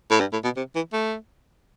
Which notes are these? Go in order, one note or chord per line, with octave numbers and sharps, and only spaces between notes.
A2
G2
A2
B2
C3
E3
A3